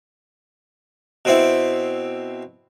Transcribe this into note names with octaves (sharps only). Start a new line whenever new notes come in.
B2 C4 E4